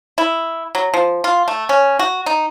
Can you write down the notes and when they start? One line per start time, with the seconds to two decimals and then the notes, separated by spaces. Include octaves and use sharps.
0.18 E4
0.75 F#3
0.94 F3
1.24 F4
1.48 A3
1.69 C#4
1.99 F#4
2.26 D#4